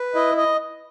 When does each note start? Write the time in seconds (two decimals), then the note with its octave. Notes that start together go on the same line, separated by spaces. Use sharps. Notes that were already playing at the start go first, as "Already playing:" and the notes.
Already playing: B4
0.15 E4 D#5
0.37 D#5